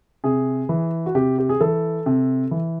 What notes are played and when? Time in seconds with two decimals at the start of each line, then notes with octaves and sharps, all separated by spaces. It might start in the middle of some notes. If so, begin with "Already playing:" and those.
0.24 C3 G#4
0.69 E3
1.06 F#4
1.15 C3 G4
1.39 G4
1.49 G#4
1.61 E3 A4
2.06 C3
2.51 E3